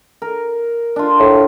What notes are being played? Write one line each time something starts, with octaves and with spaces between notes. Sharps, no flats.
A#4
D4 F4
A2